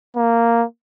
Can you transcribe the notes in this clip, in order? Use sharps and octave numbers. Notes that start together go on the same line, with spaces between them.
A#3